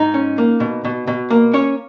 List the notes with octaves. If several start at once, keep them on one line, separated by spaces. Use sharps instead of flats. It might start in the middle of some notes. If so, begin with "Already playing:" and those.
Already playing: G#2 D#4
C#4
A#3
B2
B2
B2
A#3
C#4 C#5